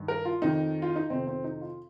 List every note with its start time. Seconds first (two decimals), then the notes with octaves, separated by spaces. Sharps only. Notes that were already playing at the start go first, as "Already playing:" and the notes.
Already playing: G2 D#3
0.08 A#4
0.25 F4
0.42 F2 D#3 D#4
0.82 F4
0.96 D#4
1.10 F2 C3 D#3 C4
1.27 C4
1.44 D#4
1.61 F4